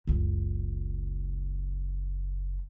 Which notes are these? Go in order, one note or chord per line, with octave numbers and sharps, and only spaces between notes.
F#1 C#2